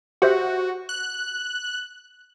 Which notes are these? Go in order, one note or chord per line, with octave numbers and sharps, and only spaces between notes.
F#4 G4 C5 E5
F#6